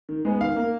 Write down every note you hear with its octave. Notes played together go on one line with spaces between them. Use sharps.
D#3
G#3 B3
D#3 F5
A#3